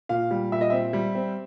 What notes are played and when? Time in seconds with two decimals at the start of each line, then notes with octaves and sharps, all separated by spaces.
0.09 A#2 F5
0.31 G3
0.52 A#2 E5
0.61 D#5
0.70 C4 E5
0.93 G3
1.15 C4